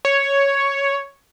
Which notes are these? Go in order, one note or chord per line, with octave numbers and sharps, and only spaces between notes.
C#5